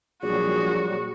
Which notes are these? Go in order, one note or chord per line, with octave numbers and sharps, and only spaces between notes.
A#1 F#3 G3 F#4 G#4